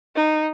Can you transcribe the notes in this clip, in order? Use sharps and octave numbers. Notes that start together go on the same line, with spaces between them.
D#4